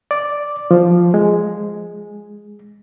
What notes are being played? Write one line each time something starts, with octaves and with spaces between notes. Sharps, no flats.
D5
F3
G#3